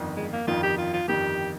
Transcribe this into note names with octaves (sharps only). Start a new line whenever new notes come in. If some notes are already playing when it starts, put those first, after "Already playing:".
Already playing: G1 F2 D#3
G#3
A#3
G1 F2 D#3 F4
G4
F4
F4
G1 F2 D#3 G4